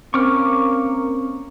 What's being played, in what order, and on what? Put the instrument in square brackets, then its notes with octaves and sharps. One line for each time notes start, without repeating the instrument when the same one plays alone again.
[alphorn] A#3 [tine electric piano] C4 C#4 [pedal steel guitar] C#6 D6 F6